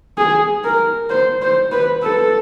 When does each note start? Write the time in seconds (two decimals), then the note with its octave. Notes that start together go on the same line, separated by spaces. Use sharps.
0.17 G#4
0.64 A#4
1.10 C5
1.42 C5
1.72 B4
2.03 A4